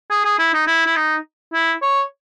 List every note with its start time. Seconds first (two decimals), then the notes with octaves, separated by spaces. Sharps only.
0.10 G#4
0.25 G#4
0.39 E4
0.54 D#4
0.67 E4
0.86 E4
0.96 D#4
1.53 E4
1.82 C#5